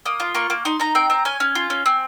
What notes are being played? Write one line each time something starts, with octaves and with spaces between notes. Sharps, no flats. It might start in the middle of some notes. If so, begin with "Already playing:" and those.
A#3 D#6
F4
A#3 C#6
A#3
D#4 C6
D#4 A#5
C4 G5
C4 A#5
C#4 G#5
C#4
F4
C#4
C4